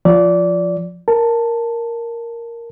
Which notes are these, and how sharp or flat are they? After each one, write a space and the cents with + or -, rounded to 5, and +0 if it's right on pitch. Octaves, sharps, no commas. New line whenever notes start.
F3 +0 D5 -20
A#4 +0 A5 +5